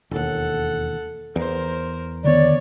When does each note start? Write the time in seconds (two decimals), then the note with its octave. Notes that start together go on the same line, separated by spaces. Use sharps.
0.11 E1 D#2 A4 F#5
1.36 E2 A#4 C5
2.24 D3 D#3 B3 C#5 D5